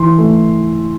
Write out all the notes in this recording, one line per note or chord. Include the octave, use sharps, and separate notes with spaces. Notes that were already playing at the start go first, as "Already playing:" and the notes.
Already playing: E3 C6
A3